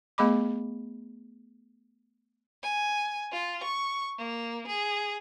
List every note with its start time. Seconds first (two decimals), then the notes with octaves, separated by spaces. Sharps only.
0.18 A3 B3 G#4 D#5 B5 D6
2.63 G#5
3.32 F4
3.64 C#6
4.18 A#3
4.67 G#4